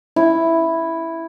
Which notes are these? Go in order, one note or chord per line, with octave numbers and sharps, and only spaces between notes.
E4